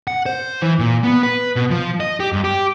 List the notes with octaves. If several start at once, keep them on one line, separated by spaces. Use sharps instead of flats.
F#5
C5
E3
A#2
B3
B4
B2
F3
D#5
G4
G2
G4